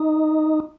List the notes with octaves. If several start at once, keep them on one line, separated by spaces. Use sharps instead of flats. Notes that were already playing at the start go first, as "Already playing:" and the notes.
Already playing: D#4